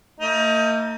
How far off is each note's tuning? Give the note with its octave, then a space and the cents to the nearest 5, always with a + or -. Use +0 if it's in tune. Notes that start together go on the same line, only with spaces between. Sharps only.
A#3 -45 D#4 +25